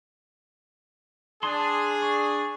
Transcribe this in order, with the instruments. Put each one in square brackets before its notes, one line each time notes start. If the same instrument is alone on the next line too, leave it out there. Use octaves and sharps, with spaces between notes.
[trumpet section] D4 G#4 [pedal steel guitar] A5 C6
[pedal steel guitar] C#6